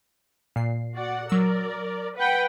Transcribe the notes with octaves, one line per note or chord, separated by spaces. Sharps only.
A#2 C7
F#4 D5 F#5
F#3 A#4 D5 E6
B4 F#5 G5